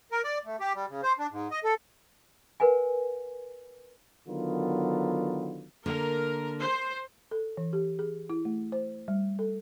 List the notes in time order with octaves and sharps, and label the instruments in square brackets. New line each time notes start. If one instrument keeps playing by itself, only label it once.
[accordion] A#4
D5
A3
G4
G3
C#3
C5
D4
G#2
D#5
A4
[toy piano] A#4 B4 F#5 G#5
[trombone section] D3 D#3 F#3 B3 F4 A#4
[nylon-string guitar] D3 A#3 [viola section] A#4
[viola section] C5
[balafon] A4
E3
G4
G#4
E4
A3
C5
G3
A4